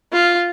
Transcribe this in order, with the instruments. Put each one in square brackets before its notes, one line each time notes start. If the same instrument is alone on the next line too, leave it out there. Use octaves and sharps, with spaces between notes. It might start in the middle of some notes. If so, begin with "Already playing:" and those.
[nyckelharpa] F4